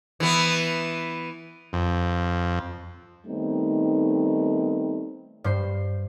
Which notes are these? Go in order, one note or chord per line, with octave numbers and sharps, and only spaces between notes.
E3 B3
F2
D#3 G3 A3 B3 C4 D#4
G2 C5 C7